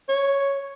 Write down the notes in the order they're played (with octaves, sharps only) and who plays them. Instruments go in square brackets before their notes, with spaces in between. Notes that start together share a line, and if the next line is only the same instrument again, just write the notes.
[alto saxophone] C#5